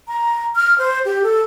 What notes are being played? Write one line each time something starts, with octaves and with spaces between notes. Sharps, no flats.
A#5
F6
C5
G4
A4